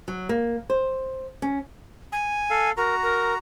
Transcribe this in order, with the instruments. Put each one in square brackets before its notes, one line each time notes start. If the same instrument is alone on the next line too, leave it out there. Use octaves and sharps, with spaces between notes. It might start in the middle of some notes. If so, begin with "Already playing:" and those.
[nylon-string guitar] F#3
A#3
C5
C#4
[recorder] G#5
[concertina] A4 F5
[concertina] F#4 A#5 [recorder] A#4
[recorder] A#4